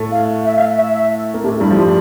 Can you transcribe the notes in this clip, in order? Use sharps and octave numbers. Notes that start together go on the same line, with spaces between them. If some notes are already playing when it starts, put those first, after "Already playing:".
Already playing: A2 A3
F5
E5
F5
E5
E5
A#3
A2 A3 G4
G2 G3 E4
F3
G3 F4